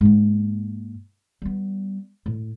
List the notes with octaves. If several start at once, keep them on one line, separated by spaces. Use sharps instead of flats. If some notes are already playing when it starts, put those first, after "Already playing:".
G#2 A#3
G3 B3
A2